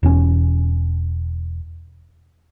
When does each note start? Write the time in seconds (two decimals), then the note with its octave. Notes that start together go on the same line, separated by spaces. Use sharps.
0.03 E1 C#4